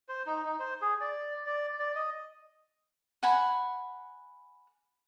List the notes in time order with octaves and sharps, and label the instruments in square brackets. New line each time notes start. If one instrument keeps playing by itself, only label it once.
[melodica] C5
D#4
D#4
C5
G#4
D5
D5
D5
D#5
[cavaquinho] F#5 G#5 B5